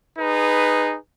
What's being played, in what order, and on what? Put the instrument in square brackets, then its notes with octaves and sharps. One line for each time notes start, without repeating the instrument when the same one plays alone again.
[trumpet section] D#4 G#4 B4